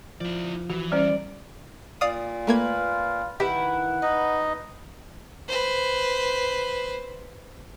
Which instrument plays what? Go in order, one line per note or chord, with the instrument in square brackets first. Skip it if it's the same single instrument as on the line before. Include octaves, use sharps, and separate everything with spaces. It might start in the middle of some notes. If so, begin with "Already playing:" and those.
[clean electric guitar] F3 [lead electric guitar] E4 D5
[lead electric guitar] E3 [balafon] F#4
[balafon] G3 C#4 C5 [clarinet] D5
[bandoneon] A#2 [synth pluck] D5 F5 D#6
[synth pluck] A3 A#3 G#6 [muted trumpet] F4 [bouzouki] B4
[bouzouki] D#3 E4 B4 [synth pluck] G4 [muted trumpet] F#5
[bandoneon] D#4 D#5 [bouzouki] B4
[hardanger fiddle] B4 C5